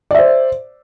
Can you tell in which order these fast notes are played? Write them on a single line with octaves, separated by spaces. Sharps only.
D5 E5 C5